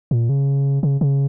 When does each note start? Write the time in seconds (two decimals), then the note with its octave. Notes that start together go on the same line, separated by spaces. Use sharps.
0.11 A#2
0.29 C#3
0.83 C#3
1.01 C#3